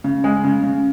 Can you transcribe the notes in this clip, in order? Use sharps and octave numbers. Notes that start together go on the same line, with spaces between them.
C#3
G#3
C#3
C#3